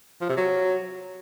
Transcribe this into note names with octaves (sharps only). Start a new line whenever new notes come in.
F3
C3
F#3